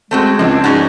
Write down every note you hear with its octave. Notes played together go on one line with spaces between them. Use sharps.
G#3 A3 C4 F#4
C#2 F3 C4 D4
G#2 C#4 F#4